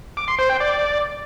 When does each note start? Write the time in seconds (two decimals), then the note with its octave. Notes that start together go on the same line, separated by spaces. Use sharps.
0.17 D6
0.28 C6
0.39 C5
0.49 G5
0.60 D5